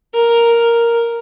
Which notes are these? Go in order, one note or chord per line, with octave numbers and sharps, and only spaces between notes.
A#4